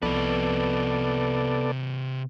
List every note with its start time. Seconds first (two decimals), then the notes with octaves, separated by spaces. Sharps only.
0.02 C2 C3 F3 B3 A4 B4 D5